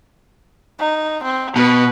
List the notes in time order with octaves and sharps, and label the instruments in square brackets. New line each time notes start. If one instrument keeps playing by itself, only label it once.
[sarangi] D#4
C4
[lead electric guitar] B2 [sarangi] B4